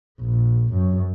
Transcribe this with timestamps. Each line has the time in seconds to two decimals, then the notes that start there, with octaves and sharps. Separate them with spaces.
0.21 A#1
0.73 F#2